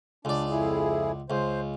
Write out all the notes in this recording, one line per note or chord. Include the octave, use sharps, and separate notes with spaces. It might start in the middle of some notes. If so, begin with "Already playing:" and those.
C#2 D4 D5
F2 E4 G#4
C#2 C5